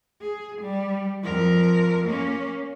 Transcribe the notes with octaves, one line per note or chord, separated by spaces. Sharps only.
G#4
G3
F2 A#4
A#3 C#4